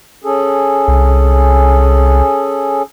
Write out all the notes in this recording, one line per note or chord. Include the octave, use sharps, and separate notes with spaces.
C#4 G#4 A4
C2